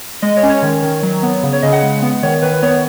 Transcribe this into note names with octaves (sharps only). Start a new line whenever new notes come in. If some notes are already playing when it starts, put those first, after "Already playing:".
G#3 D#5
C#5
C#4
C#5
D#3
D#3
F#3
B3
C#3
C#5
C#3 D#5
F#5
G#3
B3
D#3 C#5
D#3 B4
B3 C#5